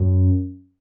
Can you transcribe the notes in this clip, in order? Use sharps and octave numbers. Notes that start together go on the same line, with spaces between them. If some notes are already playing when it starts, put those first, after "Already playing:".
Already playing: F#2